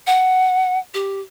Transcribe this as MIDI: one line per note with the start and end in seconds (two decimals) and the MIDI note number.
0.07 0.79 78
0.94 1.20 67